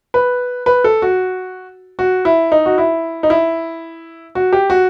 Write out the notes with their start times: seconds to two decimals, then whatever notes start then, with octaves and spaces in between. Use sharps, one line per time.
0.14 B4
0.66 B4
0.84 A4
1.02 F#4
1.99 F#4
2.25 E4
2.52 D#4
2.66 F#4
2.78 E4
3.23 D#4
3.30 E4
4.35 F#4
4.53 G4
4.70 F#4